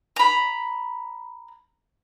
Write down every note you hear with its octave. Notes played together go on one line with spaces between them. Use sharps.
A#5 B5